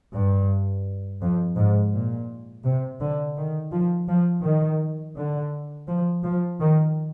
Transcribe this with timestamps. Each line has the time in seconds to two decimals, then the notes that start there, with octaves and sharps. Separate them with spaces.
0.13 G2
1.21 F2
1.56 G#2
1.93 A#2
2.64 C3
3.01 D3
3.37 D#3
3.72 F3
4.08 F3
4.44 D#3
5.17 D3
5.88 F3
6.24 F3
6.60 D#3